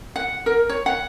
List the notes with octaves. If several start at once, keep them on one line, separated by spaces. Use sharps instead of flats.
F#5
A#4
C#5
F#5